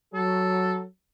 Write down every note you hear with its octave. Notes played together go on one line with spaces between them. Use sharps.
F#3 A4